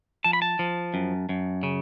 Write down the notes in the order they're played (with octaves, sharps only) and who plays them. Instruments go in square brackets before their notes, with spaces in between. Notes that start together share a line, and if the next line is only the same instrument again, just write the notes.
[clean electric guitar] F3 A5
B5
A5
F3
F#2
F#2
C#3